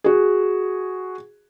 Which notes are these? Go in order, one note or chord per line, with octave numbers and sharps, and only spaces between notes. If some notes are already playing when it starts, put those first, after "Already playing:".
F#4 G#4